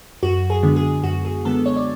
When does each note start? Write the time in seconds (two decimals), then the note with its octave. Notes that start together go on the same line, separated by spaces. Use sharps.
0.23 F#2 F#4
0.50 G#4
0.63 D3 G#3 B3
0.76 G#4
1.03 F#2 F#4
1.25 G#4
1.45 D3 G#3 B3 A4
1.66 C#5
1.76 D5